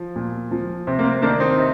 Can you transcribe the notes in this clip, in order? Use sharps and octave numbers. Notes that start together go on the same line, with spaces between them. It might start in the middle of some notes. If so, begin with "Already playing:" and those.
Already playing: F3
A#2
F3
C3 C4
A#3
C4
D#3 A#3 D4
C4 D#4
C3